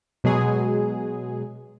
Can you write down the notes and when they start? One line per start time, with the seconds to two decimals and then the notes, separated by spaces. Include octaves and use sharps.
0.24 B2 F#3 G#3 G#4